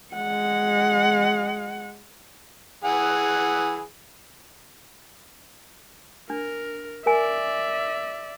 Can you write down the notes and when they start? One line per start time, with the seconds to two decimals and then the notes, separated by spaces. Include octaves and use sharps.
0.15 G#3 F#5
2.85 E3 G#4 F#5
6.30 D4 A#4
7.06 A#4 D5 E5 G#5